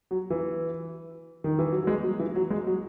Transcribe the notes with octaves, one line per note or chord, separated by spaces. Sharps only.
F#3
E3
D#3
E3
F#3
F#3
G#3
F#3
E3
F#3
G#3
F#3